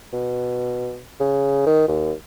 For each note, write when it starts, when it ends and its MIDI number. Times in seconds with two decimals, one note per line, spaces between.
0.13 1.00 47
1.20 1.62 49
1.66 1.88 51
1.88 2.12 39